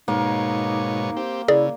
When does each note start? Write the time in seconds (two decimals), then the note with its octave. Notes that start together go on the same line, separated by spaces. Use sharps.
0.08 G#2 B2 A#3 D#4 C#5
1.17 C4 G4
1.48 C#3 E4 G#4 D5